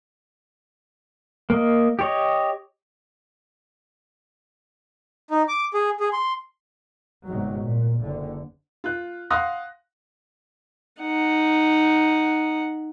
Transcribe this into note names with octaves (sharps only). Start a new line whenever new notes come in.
A#3 D#5
G4 C#5 D#5
D#4
D6
G#4
G#4
C6
G1 G#2 C3 F#3
A#2
F#1 D3
F4 F#6
F5 F#5 C6 D#6 F#6 A#6
D#4 F#5